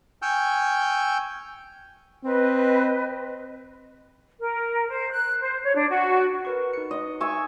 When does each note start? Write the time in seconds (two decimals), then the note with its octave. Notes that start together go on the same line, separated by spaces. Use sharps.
0.22 G5 G#5 C#6 E6 F6 G6
2.23 C4 B4 D#5
4.40 A#4
4.90 C5
5.11 F#6
5.41 C5
5.63 C#5
5.75 D4
5.89 F#4
6.45 A#4 B4 C#6
6.73 D#4 C#7
6.91 D#5
7.21 E5 G#5 C#6